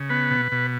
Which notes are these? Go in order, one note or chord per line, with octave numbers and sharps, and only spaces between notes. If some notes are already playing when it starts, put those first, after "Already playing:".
Already playing: C#3
B3 B4
B2
B2